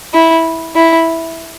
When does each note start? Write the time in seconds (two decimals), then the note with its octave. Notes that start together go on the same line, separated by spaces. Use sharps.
0.14 E4
0.76 E4